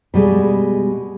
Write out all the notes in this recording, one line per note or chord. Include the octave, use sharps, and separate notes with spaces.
B2 G3 G#3